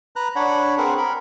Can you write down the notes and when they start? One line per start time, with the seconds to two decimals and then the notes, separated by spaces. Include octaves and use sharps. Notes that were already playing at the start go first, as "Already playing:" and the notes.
0.16 B4 A#5 F#6
0.36 D4 C#5 F#5 B5
0.78 C4 G#4 A#4 B4 F#5
0.98 A#4 B5